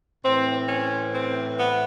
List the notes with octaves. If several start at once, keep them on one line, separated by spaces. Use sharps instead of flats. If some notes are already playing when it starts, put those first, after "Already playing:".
A2 E3 C4
C#4
C4
B3